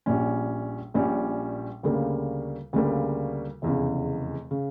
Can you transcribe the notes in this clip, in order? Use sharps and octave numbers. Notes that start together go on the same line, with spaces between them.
A#1 A#2 G3 C#4
A#1 A#2 G3 C#4
D2 C#3 G3 A#3
D2 C#3 G3 A#3
F1 E2 C#3
C#3